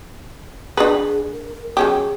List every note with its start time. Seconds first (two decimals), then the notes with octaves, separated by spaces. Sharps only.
0.77 D4 F#4 G#4 B4
1.32 A#4
1.77 F#3 C#4 G4 G#4